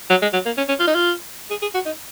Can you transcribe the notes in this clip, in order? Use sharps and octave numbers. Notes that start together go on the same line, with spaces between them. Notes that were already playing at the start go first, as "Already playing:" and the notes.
F#3
G#3
F#3
A#3
C#4
C#4
F4
D#4
F4
G#4
G#4
F#4
D#4